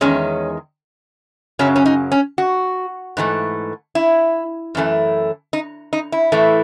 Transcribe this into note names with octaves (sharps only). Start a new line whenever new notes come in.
E2 D#3 G#3 C#4
F#2 C#3 F#3 C#4
C#4
D#4
C#4
F#4
G#2 E3 A3
E4
F#2 E3 A3
D#4
D#4
E4
A2 E3 A3